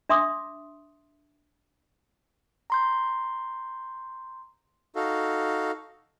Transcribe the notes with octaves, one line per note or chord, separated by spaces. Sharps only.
D4 E5 C6 D6 D#6
A#5 C6 G6
D#4 F#4 A4 F5